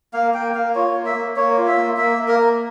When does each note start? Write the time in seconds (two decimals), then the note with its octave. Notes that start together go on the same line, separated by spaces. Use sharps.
0.13 A#3 F5
0.34 A#3 G5
0.55 A#3 F5
0.75 F4 C#5
0.95 A#3
1.06 E5
1.15 A#3
1.36 A#3 C#5
1.57 F4
1.67 E5
1.78 A#3
1.97 A#3 E5
2.18 A#3
2.28 A#4
2.39 A#3